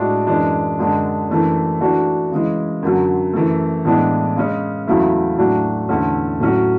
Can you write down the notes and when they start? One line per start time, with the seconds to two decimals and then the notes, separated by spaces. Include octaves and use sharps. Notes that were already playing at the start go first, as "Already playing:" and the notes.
Already playing: A2 G#3 D4 F#4
0.27 F#2 E3 G#3 D4
0.79 F#2 D3 G#3 D4
1.29 F#2 E3 A3 D4
1.80 E3 A3 D4 F#4
2.32 C#3 E3 G#3
2.82 F#2 D3 F#3
3.33 F#2 E3 A3
3.85 A2 E3 G#3 B3 D4
4.36 C#3 G#3 C#4
4.87 E2 C#3 F#3 A3 E4
5.38 A2 F#3 A3 D4 F#4
5.89 E2 D3 A3 C#4
6.40 A2 F#3 C#4 F#4